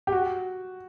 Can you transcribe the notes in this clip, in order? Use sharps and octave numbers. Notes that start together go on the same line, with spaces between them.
G4
F#4